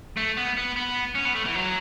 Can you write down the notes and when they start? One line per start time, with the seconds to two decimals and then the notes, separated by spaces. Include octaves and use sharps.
0.17 A3
0.37 B3
0.57 B3
0.76 B3
1.15 C#4
1.25 B3
1.35 A3
1.45 E3
1.55 F#3